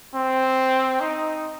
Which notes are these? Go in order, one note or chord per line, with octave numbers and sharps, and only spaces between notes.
C4
D#4